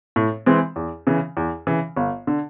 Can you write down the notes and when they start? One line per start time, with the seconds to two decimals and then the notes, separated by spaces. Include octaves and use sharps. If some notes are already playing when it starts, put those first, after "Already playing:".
0.16 A2
0.46 E3 G#3 C4
0.76 E2
1.07 C#3 E3
1.37 E2
1.67 C#3 E3
1.96 G1
2.27 D3